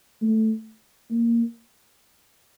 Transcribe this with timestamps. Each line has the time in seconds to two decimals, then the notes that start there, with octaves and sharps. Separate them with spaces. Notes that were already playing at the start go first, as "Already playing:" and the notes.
0.21 A3
1.10 A#3